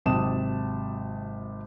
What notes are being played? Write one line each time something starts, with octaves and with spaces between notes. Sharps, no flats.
G#1 C3 F#3 A5 D#6 E7